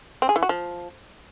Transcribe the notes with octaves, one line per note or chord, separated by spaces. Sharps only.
C4
G#4
E3
F#4
F3